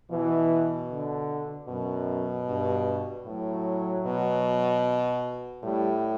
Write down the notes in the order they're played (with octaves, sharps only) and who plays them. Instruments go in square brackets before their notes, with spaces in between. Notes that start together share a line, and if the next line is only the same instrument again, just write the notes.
[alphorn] B2 [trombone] E3
[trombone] D3
[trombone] F#2 [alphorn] B2
[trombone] G2
[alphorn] A2 [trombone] F#3
[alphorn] B2
[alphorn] A2 [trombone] G3